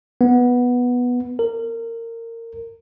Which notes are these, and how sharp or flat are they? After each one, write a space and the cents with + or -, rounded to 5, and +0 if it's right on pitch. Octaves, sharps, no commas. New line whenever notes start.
B3 -5
A#4 -25